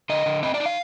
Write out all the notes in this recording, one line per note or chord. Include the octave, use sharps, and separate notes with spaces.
D3 D#5
D3
C4 D#5
D5
D#4
F5